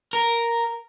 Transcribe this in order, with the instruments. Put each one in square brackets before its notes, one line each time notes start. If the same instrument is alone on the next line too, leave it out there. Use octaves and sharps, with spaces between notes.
[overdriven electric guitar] A#4